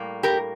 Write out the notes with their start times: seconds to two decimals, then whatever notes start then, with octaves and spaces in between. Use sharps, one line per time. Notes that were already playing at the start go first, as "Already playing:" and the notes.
Already playing: A2 G3 A#3
0.23 G4 A#4